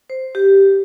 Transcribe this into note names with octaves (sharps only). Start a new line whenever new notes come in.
C5
G4